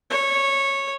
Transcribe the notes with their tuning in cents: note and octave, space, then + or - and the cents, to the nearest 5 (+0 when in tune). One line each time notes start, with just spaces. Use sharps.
C#5 -10